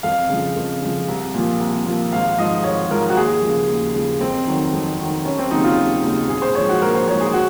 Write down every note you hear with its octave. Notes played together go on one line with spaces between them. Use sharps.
F2 F5
C#3 F3
F2
C#3 F3
C2
A#2 F3
C2
A#2 F3
G#1 F5
G#2 F3 D#5
G#1 C#5
G#2 F3 A#4
F#4
D#2 G#4
F3
C#3
D#2
C#3 F3
F2 C4
D#3 F#3
F2
D#3 F#3
F1 C#4
C4
D#2 C#3 F#3 D#4
F4
F1
D#2 C#3 F#3
A#1 G#4
C5
G#2 F3 C#5
F#4
A#1 A#4
C5
G#2 F3 C#5
G#4
F#4